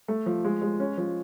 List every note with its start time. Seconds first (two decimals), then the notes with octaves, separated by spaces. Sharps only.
0.08 A3
0.26 F3
0.44 G#3
0.62 G#3
0.80 C#4
0.98 F3